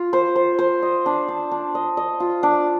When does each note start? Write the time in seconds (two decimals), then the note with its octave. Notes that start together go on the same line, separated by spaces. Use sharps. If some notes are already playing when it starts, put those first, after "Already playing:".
Already playing: F4
0.13 C5
0.36 C5
0.59 C5
0.82 D#5
1.06 D4
1.28 D4
1.51 D4
1.75 D#5
1.97 D#5
2.20 F4
2.43 D4